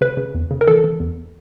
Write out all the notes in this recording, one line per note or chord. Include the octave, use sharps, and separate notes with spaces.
C#3 B4
C#3
E2
C#3
A#4
E3 A4
E3
E2